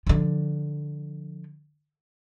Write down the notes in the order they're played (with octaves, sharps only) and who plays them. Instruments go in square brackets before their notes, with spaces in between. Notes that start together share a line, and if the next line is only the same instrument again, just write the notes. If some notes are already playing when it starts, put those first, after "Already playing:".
[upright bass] D3 F3